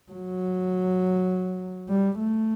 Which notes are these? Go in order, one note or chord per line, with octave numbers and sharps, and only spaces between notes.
F#3
G3
A3